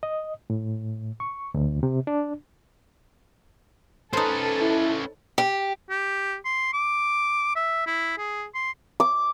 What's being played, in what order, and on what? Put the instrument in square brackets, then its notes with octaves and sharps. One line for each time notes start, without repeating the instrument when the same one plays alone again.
[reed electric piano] D#5
A2
C#6
D2
C3
D4
[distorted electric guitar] C#4 B4 [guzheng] D#4 C5 [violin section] A4
[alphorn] E4
[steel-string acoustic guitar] G4
[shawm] G4
C6
D6
E5
E4
G#4
C6
[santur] D6